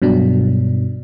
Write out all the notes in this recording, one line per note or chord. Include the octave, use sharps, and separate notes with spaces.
G2 B2 F#3 D4